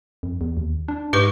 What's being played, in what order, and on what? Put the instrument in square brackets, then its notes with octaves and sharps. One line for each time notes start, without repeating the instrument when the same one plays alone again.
[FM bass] F2
E2
D#2
D4
[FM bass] G#2 [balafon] G4 B4 C#6